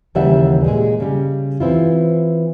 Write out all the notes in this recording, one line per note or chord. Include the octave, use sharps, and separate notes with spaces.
D#2 C#3 E3 G3 E5 F#5
A#2 G#3 G#4
C#3 G3
E3 C4 E4 F4